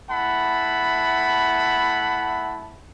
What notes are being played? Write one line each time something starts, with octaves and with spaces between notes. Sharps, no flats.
A3 E4 F#5 A5 B5